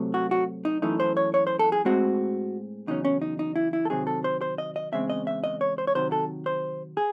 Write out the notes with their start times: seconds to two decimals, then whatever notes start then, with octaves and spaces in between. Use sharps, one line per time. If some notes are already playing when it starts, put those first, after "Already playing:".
Already playing: C3 F#3 A3
0.14 F#4
0.31 F#4
0.65 D#4
0.82 F#2 E3 A3 D#4
1.00 C5
1.17 C#5
1.34 C#5
1.47 C5
1.59 A4
1.72 G#4
1.85 A2 G#3 C4 F#4
2.87 E2 C#3 F#3 C#4 D#4
3.05 C#4
3.22 D#4
3.39 D#4
3.56 E4
3.73 E4
3.85 A4
3.90 C3 D#3 F#3 C4 G#4
4.07 A4
4.24 C5
4.41 C5
4.58 D#5
4.76 D#5
4.92 E2 C#3 G#3 C4 E5
5.10 D#5
5.27 E5
5.44 D#5
5.61 C#5
5.78 C5
5.87 C#5
5.95 C3 D#3 F#3 C5
6.12 A4
6.46 C5
6.97 G#4